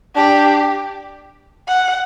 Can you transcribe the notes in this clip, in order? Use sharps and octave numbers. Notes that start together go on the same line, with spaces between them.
D4 G4
F#5